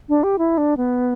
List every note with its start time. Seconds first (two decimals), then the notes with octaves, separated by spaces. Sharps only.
0.09 D4
0.23 G4
0.38 E4
0.58 D4
0.77 B3